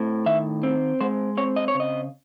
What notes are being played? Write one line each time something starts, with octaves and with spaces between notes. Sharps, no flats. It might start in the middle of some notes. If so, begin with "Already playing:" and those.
Already playing: A2 C4
D#3 E5
C4
G#3 C5
C4 C#5
D#5
C#5
C#3
D#5